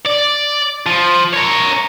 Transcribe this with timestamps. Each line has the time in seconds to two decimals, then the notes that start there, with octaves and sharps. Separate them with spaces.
0.06 D5
0.87 F3
1.33 A#4 C#5